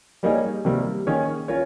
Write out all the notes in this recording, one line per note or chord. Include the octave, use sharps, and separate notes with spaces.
G3 A#3 D#4 G#4 C#5
C3 D#3 G3 A#3
D#3 A#3 C#4 G#4 C#5
C#4 F4 A#4 C#5